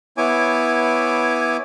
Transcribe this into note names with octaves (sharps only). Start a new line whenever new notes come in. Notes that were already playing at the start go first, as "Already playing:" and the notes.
B3 E4 C#5 G#5 D6